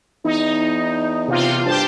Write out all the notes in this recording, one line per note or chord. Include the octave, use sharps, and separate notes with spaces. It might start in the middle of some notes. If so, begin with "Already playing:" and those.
E2 D#4
C3 F4
G2 G4 C5 A5